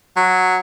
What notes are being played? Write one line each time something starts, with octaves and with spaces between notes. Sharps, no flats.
F#3